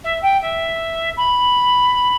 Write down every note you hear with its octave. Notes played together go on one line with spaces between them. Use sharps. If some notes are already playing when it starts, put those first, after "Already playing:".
E5
G5
E5
B5